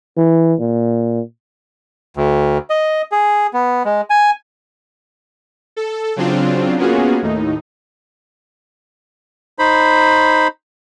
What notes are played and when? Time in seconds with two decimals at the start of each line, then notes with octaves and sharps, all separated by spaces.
0.17 E3
0.60 A#2
2.17 D2
2.70 D#5
3.12 G#4
3.54 B3
3.85 G#3
4.10 G#5
5.76 A4
6.16 C#3 F#3 C4 D4 F4
6.78 A#3 B3 C#4 F4 F#4 G#4
7.22 D#2 A2 D#4
9.59 D#4 C5 B5